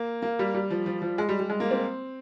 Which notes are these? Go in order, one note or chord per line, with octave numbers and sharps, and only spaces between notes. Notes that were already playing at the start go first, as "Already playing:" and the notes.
Already playing: A#3
A#3
G3
G3
F3
F3
F3
G#3
G3
G3
G#3
A#3
C4